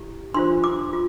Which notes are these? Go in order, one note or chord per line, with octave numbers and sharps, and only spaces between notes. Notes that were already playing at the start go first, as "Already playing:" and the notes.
Already playing: E4 G4
D4 F4 C5 C6
D6
F4